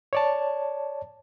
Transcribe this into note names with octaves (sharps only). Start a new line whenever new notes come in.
C#5 D5 A5